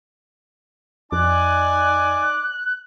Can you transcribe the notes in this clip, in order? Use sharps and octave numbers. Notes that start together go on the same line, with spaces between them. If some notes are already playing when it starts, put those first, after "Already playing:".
F2 D#4 D5 G#5 D6 F#6